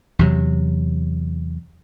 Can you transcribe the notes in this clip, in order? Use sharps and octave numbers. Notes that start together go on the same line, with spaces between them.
E2 C3 F#3